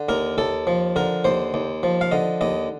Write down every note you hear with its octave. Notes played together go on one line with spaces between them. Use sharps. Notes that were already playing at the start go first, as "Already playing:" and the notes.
Already playing: D3
D#2 A#4
D#2 A4
F3
D3 A#4
D#2 C5
D#2
F3
F5
D3 D#5
D#2 D#5